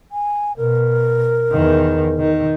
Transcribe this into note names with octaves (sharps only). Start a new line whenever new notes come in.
G#5
B2 A#4
E2 D#3
D#3